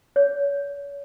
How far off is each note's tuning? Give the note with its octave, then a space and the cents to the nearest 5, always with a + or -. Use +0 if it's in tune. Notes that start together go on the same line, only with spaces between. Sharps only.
C#5 +25